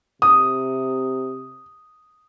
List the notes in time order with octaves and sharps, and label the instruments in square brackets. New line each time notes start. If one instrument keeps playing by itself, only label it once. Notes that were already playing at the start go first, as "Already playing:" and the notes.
[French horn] C3 [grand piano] D#6